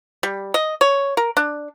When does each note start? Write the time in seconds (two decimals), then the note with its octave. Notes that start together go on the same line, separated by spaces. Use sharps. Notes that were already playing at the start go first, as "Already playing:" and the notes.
0.23 G3
0.54 D#5
0.81 C#5
1.17 A#4
1.37 D4